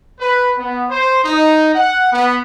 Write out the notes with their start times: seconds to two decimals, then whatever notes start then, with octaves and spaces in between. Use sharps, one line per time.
0.20 B4
0.58 B3
0.90 C5
1.25 D#4
1.75 F#5
2.12 B3